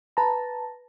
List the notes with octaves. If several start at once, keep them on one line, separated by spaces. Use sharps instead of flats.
B4 A5 A#5